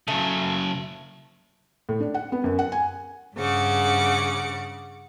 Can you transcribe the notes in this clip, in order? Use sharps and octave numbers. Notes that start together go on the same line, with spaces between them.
C#3 F#3 A3
A2
D4
F#5
B3
F#2
F#5
G#5
G2 C#3 F#5 D6